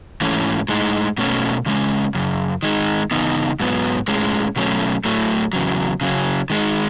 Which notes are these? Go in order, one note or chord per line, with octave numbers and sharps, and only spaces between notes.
G#2 E3 A3 C#4
A2 G#3 D#4
B2 A3 C#4
E2 C#3 G#3 C#4
F#2 C#3
D#3 G#3 D#4
C#3 E3 B3 D#4
G#2 F#3 B3
A2 G#3 C#4
B2 F#3 A3 C#4
A2 F#3 A3
E2 C#3 F#3
C#3 F#3 C#4
D#3 G#3 D#4